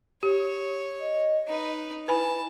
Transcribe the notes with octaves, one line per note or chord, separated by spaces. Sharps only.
G4 C#5
D#5
D#4 B4
E4 B4 G#5 A5 B5